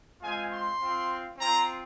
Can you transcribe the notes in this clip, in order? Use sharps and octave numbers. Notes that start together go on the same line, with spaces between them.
G#3 C4 F4 G#5
C6
C4 F4
C4 F4 A#5